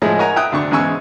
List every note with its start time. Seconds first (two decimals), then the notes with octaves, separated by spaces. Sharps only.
0.02 A2 F3 G#3 G#4
0.18 D#4 A#4 C#5 F#5 G#5 A#5
0.36 E5 G5 D#6 F#6
0.52 D2 D4 C#6
0.71 E2 G#2 C#3 G#5 C#6 E6